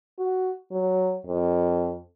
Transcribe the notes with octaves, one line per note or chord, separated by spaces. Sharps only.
F#4
F#3
F2